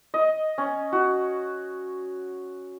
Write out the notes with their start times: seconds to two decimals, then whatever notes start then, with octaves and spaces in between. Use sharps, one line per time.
0.14 D#5
0.58 C#4
0.92 F#4